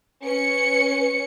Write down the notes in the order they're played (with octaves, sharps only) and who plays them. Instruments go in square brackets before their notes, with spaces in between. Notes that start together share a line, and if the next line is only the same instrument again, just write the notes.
[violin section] C#4 C#7 [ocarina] B4